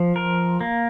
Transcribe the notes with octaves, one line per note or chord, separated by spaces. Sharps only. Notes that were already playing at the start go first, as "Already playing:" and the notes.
Already playing: F3
A#4
A#3